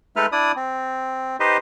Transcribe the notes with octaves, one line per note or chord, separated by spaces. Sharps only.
G#3 A3 D#4 A4 B4 F6
D4 E4 D5 D#6
C4
D#4 G4 B4 C5 D#5